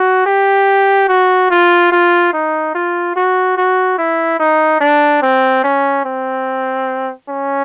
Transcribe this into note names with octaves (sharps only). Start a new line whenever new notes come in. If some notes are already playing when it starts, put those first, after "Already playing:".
Already playing: F#4
G4
F#4
F4
F4
D#4
F4
F#4
F#4
E4
D#4
D4
C4
C#4
C4
C#4